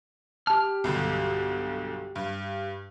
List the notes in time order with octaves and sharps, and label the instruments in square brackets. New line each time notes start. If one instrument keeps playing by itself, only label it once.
[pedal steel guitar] G4 F6 [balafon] A5
[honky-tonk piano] B1 G2 D3
G2